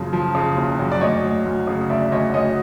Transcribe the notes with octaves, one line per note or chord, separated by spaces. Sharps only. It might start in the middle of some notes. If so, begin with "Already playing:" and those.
Already playing: F#1 F#2 C#3 F3
F3
C#3
F#1
F#2
D5
D2 C#5 D#5
D2
D2
C#3
D2 D5 E5
D2 C#5 D#5
D2 C#5 D#5